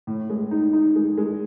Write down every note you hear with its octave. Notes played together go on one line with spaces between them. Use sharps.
A2
G#3
D#4
D#4
G#3
G#3